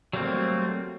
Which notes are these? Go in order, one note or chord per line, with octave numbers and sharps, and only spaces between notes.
F#3 G3 A3 A#3 C4